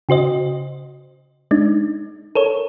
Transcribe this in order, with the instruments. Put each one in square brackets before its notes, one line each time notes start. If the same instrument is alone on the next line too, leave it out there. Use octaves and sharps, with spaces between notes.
[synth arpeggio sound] C#3 F#4 C5 D#5
G#3 D4 D#4
A4 A#4 C#5